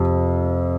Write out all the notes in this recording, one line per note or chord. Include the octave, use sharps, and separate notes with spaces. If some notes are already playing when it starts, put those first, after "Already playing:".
Already playing: F2 C3